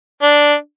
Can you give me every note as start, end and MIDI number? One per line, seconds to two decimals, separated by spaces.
0.22 0.54 62